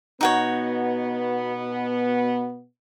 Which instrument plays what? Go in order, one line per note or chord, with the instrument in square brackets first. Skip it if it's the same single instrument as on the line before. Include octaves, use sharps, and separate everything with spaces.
[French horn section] B2 B3 [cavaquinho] D#4 F#4 C#5